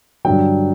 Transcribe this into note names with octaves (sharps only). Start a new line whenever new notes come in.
G2 D3 F#3 G5